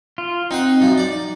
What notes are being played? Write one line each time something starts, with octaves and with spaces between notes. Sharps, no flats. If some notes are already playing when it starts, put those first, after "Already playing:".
F4
C4 D#4 F#5
F#2 F3
D5